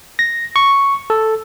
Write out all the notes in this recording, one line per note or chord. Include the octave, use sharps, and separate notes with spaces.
A#6
C#6
A4